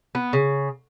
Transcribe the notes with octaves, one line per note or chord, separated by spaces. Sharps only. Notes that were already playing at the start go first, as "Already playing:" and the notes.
B3
C#3